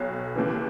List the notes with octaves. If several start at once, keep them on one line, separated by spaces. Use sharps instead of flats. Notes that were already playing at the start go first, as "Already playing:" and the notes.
Already playing: B1 B2 C#5
D#2 C#3 E3